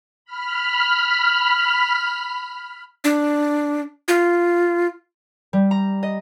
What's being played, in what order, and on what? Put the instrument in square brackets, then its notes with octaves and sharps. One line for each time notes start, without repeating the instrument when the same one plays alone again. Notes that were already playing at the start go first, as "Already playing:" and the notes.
[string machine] B5 F6
[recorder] D4
F4
[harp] G3
A#5
D#5